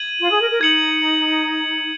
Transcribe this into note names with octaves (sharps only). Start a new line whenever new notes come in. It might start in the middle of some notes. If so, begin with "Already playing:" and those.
Already playing: G#6 D#7 F#7
F4
G#4
A#4
A#4
D#4 G#6 C#7 F#7